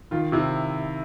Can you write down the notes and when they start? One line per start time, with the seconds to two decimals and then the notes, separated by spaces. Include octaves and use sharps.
0.11 D#3 F4
0.32 C3 E4